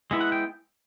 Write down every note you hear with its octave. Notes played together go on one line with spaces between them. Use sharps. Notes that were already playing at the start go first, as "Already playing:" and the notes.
G#3 B3 E4
F#5
G5